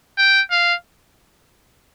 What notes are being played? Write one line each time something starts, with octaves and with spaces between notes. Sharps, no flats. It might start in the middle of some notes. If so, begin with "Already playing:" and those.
G5
F5